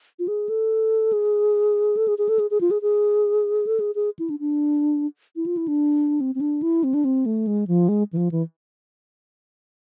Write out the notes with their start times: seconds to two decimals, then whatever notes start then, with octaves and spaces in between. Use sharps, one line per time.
0.19 F4
0.28 G#4
0.49 A4
1.13 G#4
1.97 A4
2.08 G#4
2.18 G#4
2.29 A4
2.39 G#4
2.51 G#4
2.61 F4
2.71 G#4
2.82 G#4
3.67 A4
3.80 G#4
3.95 G#4
4.19 E4
4.30 D4
4.40 D4
5.36 E4
5.46 F4
5.57 E4
5.68 D4
6.21 C4
6.35 C4
6.41 D4
6.62 E4
6.84 C4
6.94 D4
7.05 C4
7.26 A3
7.47 G#3
7.67 F3
7.89 G#3
8.13 E3
8.17 F3
8.31 E3